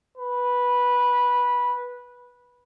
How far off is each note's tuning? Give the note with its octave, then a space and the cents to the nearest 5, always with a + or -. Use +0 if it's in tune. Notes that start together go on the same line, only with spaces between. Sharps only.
B4 -10